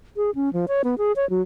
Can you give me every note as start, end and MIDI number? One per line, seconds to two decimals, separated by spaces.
0.17 0.31 68
0.35 0.52 61
0.53 0.66 53
0.68 0.82 73
0.84 0.95 59
0.98 1.12 68
1.16 1.28 73
1.30 1.42 54